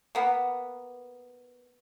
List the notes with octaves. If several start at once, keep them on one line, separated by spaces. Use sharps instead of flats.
A#3 B3